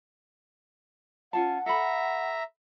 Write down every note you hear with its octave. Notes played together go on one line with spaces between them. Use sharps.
C#4 F4 F#5 A5
A4 E5 A#5 B5